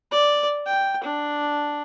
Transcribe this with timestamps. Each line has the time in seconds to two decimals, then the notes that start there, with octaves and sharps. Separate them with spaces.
0.11 D5
0.66 G5
1.04 D4